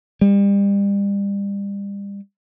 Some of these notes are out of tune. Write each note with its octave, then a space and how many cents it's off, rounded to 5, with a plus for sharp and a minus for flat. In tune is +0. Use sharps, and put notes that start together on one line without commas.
G3 +35